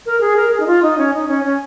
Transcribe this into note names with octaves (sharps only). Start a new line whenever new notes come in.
A#4
G#4
A#4
G#4
D#4
F4
D#4
C#4
D#4
C#4
C#4